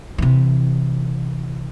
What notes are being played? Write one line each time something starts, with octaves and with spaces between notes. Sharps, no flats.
C3 E3